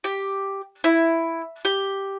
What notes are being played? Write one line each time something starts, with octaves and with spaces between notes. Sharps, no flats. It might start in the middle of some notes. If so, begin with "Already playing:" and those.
G4
E4
G4